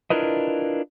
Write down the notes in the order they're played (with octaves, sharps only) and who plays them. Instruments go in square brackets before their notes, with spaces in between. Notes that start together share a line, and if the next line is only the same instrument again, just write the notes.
[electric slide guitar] D4 E4 F4 A#4 B4 D#5